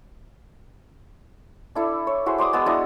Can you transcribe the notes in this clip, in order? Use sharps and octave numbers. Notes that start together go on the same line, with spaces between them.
D4 E4 A4
C#5
E4 F#4 G#4 C5
D5 C6 D6 D#6
G#3 B3 D#6 E6
D4 E4 F#4 D#5